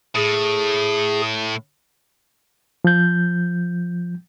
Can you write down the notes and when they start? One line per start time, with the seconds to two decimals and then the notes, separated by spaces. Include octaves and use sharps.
0.15 A2 G#4
2.84 F3 G6